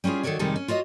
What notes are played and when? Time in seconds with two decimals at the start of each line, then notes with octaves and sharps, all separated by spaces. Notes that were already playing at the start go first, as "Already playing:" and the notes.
0.04 G3 C#4 E4 F4 G#4
0.23 D#3 F#4 A4 B4 C#5 D5
0.39 F2 C3 D#3 G3 G#3 A4
0.56 C#4
0.68 F4 F#4 C#5 D#5